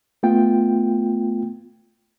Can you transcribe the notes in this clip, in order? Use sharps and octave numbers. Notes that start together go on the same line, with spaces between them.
A3 B3 F4 G5